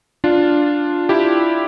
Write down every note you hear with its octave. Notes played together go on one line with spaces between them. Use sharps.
D4 F4
E4 G4